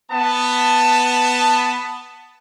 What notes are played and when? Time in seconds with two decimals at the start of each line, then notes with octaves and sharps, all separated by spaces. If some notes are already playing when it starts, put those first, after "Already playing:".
0.11 B3 A5